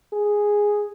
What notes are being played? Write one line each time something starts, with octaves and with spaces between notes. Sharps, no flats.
G#4